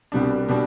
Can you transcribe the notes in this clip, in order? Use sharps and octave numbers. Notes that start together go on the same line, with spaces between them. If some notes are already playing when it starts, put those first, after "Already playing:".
C2 B2 G3 D4
B2 G3 D4